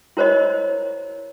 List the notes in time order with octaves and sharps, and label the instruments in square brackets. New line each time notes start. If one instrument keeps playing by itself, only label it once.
[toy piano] E4 A#4 C5 C#5 D#5